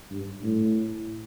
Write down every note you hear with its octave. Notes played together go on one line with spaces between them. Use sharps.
G2
A2